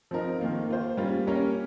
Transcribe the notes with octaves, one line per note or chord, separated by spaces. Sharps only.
F3 C4 D#4 A#4
D#3 A#3 F4
A#3 F4 C5
G3 A#3 C#4 F4
A#3 C#4 G4 A#4 C#5